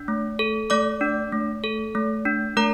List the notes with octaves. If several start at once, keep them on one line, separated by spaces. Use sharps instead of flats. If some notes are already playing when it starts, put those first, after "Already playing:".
Already playing: D4
A3
A4
A3 D5 D6
D4
A3
A4
A3
D4
A3 A#4 A#5